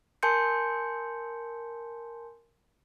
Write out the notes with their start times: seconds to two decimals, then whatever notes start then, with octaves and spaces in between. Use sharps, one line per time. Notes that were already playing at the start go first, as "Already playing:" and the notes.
0.23 A#4 G#5 A5 C6 G6 C#7